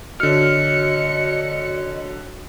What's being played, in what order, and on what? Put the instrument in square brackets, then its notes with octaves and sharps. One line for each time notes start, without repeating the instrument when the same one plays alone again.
[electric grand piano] D3 F6 [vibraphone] F#4 C#5 [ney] D#5 [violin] C#7